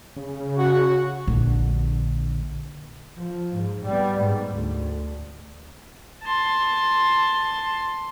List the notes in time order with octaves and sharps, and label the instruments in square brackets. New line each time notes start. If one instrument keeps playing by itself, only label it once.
[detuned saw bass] C#3
[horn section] F#4
[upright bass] A#1 D3
[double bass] F3
G#2
G3 B3
G#2
D2
[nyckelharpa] A5 C6